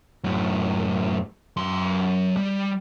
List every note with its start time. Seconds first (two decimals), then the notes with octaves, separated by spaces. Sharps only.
0.24 F#2 A2
1.57 F#2 C6
2.37 G3